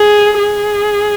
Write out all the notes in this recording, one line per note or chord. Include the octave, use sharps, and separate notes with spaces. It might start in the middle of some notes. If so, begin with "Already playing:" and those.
Already playing: G#4
G#4